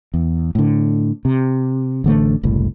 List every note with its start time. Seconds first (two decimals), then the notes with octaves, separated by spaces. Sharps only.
0.14 E2
0.55 A2 D3
1.25 C3
2.04 A1 D3 A3
2.43 F#1 C2 A2